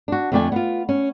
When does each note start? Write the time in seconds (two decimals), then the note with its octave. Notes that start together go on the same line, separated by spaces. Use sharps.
0.08 D4 F#4
0.32 F2 D3 A3 D5 G5 G#5
0.52 B3 F4
0.89 C#4